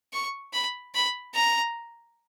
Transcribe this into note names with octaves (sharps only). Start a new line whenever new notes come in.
C#6
B5
B5
A#5